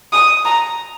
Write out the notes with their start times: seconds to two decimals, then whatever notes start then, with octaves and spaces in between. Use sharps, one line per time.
0.13 D#6
0.45 A#5